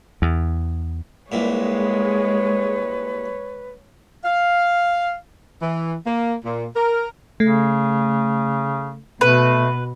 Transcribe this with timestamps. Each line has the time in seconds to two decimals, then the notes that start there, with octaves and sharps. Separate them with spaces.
0.22 E2
1.32 C2 A#2 G#3 B4 C#5
4.24 F5
5.62 E3
6.06 A#3
6.45 A#2
6.76 A#4
7.40 C#3 A3
9.21 B2 A3 B4